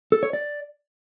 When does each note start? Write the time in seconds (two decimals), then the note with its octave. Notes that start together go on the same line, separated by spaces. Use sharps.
0.12 A4
0.23 C#5
0.33 D5